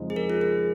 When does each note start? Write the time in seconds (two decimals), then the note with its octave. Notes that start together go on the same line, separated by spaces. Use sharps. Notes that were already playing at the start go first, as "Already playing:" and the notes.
Already playing: F2 C#3 F3 G#3 D#4
0.10 G#4
0.16 A#4
0.30 F4
0.41 G#4